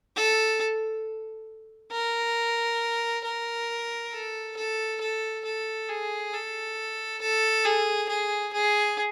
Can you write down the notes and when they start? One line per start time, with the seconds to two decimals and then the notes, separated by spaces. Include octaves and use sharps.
0.16 A4
1.92 A#4
3.24 A#4
4.12 A4
4.56 A4
5.01 A4
5.44 A4
5.89 G#4
6.33 A4
7.22 A4
7.66 G#4
8.09 G#4
8.53 G#4